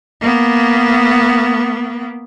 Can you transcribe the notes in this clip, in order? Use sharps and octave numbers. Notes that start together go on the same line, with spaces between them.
A#3 B3